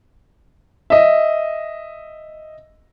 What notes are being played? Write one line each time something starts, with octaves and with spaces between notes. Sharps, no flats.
D#5 E5